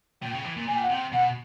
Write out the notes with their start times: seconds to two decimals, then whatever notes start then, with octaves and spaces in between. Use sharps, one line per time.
0.22 A#2 G5
0.34 C#3
0.44 E3
0.56 A#2
0.67 A#2 G#5
0.75 G5
0.82 F#5
0.89 C3 G5
1.12 B2 F#5